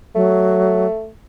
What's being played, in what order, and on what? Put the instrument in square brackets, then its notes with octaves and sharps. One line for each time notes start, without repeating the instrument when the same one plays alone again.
[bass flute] F#3 [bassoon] A3